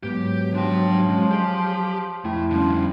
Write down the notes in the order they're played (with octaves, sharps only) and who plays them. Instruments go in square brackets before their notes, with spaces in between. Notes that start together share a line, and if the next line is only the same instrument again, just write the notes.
[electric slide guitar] G#2 B3 [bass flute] F#3 [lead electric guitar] G4
[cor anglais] F3 [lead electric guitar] D4 G5
[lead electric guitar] G#3 [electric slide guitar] C#4
[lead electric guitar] G4 [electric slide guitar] G#4
[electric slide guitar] F2 E4 G5 [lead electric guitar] A3
[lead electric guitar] D3 G3 [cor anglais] F3 [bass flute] C#4